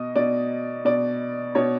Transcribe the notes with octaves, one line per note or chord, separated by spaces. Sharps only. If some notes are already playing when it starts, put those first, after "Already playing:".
Already playing: B2 D#5
B2 D5
B2 D5
B2 C#5